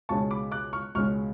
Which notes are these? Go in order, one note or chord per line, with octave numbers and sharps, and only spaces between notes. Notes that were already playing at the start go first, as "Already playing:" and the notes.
C#2 B2 G#3 C#4 A5 C#6
B5 D6
D6 F#6
C#6 F6
C#2 B2 G#3 C#4 C#6 F6